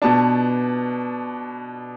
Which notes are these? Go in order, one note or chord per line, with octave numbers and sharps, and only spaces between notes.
B2 B3 D4 A5